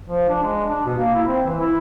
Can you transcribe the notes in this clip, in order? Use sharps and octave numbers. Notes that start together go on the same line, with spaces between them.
F3
D4
G#3
D4
B2
A#3
E4
C4
E3
E4